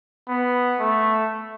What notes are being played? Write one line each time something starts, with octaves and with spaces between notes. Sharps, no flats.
B3
A3